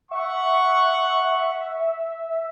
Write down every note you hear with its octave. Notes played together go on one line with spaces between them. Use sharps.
E5 F#5 C#6